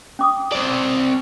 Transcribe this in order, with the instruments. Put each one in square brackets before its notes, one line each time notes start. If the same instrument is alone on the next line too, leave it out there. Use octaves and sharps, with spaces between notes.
[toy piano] C#4 D6 D#6
[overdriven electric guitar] C4 D5